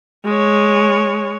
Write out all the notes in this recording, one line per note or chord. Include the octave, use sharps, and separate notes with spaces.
G#3 C#5